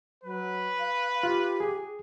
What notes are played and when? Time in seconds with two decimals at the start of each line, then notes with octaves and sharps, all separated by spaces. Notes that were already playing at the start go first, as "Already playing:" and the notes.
0.24 F#3 B4
0.79 F5
1.23 F4 G4
1.60 G#4